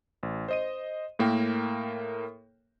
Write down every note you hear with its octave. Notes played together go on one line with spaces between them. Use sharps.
A1
C5 D#5 D#7
A2 A#3 A#4 G5